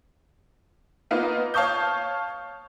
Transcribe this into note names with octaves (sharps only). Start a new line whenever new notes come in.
A#3 B3 D#4 F4 B4
C#5 F5 A5 C#6 D#6 G6